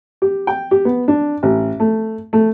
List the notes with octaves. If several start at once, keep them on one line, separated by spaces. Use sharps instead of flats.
G4
G5
G4
B3
D4
A1
A3
A3